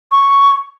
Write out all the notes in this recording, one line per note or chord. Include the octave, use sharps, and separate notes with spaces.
C#6